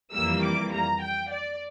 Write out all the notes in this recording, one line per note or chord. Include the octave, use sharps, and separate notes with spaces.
F2 E3 G3 A#3 E6
D6
A#5
G5
D5